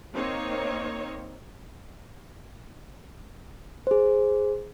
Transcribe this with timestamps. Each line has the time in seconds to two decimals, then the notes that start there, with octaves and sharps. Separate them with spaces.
0.15 A#3 C4 D#4 C#5
3.87 G#4 C5